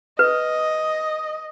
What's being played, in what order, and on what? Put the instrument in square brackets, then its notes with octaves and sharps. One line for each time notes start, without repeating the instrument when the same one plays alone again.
[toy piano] B4 [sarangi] D#5